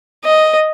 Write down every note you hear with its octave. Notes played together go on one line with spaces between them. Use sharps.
D#5